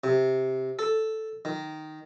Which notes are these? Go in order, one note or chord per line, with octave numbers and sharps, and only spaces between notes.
C3
A4
D#3